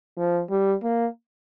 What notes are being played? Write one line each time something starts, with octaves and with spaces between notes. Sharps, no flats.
F3
G3
A#3